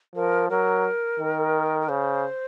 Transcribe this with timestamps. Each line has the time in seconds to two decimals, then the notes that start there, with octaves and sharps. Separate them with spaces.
0.16 F3 A#4
0.50 F#3 A#4
1.20 D#3
1.81 A#4
1.89 C#3 C5